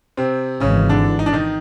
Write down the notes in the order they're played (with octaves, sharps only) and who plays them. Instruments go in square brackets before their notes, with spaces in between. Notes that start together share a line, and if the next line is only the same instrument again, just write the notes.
[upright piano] C3 C4
[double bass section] G#1 G#2 E3 [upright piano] C#3 C#4
[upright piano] D3 D4
D#4
D4
D#3 D#4